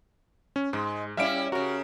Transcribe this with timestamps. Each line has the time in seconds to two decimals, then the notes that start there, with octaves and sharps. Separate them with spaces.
0.56 C#4
0.73 G#2 G#3
1.17 G3 C#4 E4 E5 F5 D7
1.52 C#3 F#4 A#4